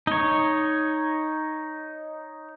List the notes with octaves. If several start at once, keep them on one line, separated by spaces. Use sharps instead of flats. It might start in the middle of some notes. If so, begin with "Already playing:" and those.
D#4 C#5